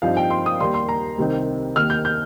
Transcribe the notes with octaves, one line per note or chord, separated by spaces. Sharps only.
G2 F3 C4 D#4 F5
G5
C6
D#6
D#2 D#3 G3 C6
C6
A#5
C2 C3 D#3 C4 D#4
D#2 D#3 A#3 D#4 F6
G6
G6